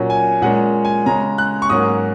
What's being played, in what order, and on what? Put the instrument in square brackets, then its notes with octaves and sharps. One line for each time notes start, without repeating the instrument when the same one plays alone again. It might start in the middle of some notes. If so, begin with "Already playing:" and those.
Already playing: [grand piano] A#2 F#3 C#4
G#5
A#2 G#3 C#4 F#5
G#5
C#3 G#3 C#4 A#5
F#6
C#6
G#2 F#3 A#3 C#4 D#6